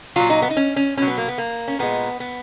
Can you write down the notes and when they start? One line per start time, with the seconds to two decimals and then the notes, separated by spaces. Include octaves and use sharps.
0.16 A#2 F#3 F4
0.30 D#4
0.42 B3
0.50 D#4
0.57 C#4
0.76 C#4
0.97 B2 F#3 C#4
1.08 B3
1.18 A#3
1.28 B3
1.38 A#3
1.68 C#4
1.79 A#2 G#3 B3
2.20 B3